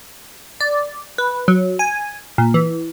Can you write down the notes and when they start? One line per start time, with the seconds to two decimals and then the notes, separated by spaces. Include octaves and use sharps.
0.61 D5
1.18 B4
1.48 F#3
1.79 G#5
2.38 A#2
2.54 E3